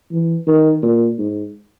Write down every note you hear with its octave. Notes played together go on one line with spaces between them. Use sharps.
E3
D#3
A#2
G#2